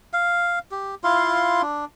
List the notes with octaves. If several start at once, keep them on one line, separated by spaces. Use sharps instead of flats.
F5
G4
E4 F4 F5 C6
D4